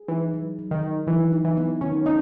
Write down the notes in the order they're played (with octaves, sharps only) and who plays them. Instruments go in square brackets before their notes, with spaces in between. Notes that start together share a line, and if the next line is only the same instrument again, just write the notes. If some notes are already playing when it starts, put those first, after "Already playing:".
Already playing: [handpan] G#4
[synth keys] E3 [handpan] D#4
[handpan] F#3
F#3
[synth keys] D#3
[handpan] D#4
[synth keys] E3 [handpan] F#3
[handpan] D#4
[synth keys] E3
[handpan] B3
[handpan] D#3 [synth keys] C#4
[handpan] C#4 [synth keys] D#4